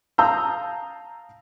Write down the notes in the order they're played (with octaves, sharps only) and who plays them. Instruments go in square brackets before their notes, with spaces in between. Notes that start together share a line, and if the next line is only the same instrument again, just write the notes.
[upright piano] F5 A5 A#5 D#6 E6 G6